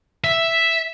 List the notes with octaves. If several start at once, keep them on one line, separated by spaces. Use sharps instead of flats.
E5